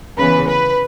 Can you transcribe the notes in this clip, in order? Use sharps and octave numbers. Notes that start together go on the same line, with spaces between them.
C#3 E3 B3 B4
B4